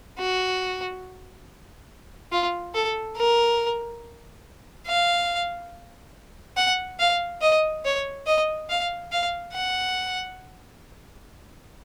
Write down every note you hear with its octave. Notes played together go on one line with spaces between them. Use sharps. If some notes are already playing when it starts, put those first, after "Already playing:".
F#4
F4
A4
A#4
F5
F#5
F5
D#5
C#5
D#5
F5
F5
F#5